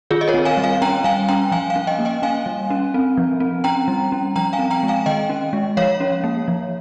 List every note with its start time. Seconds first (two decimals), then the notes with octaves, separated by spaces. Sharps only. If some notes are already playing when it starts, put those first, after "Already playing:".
0.10 D#3 F4 G#4
0.21 D#5
0.28 A#4 C#5
0.34 C4
0.45 F5 G#5
0.57 G3
0.64 F5 G#5
0.82 C#4 G5 A#5
1.04 G3 F5 G#5
1.28 C#4 G5 A#5
1.52 F3 F5 G#5
1.70 F5 G#5
1.76 C#4
1.87 D#5 G5
1.99 A#3
2.05 D#5 G5
2.22 C#4 F5 G#5
2.46 G3
2.70 C#4
2.94 C4
3.17 F3
3.40 C4
3.64 C#4 G5 A#5
3.88 G3
4.12 C#4
4.36 F3 G5 A#5
4.53 F5 G#5
4.59 C4
4.70 G5 A#5
4.83 G#3
4.88 F5 G#5
5.06 D#3 D#5 G5
5.30 C#4
5.53 G#3
5.77 F3 C#5 F5
6.00 C#4
6.24 A#3
6.48 F3